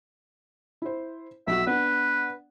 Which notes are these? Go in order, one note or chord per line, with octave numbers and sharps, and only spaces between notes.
E4 C5
B1 F#4 E5
B3 D4 B4 F#5